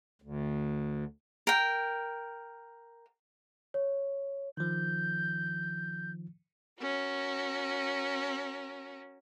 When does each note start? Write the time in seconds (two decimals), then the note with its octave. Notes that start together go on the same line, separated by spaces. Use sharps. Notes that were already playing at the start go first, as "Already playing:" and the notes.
0.22 D2
1.47 A#4 G5
3.74 C#5
4.57 D#3 F3 G6
6.80 C#4 F#4 A#4